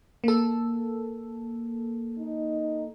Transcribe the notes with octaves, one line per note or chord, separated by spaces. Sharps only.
A#3 A4
D#4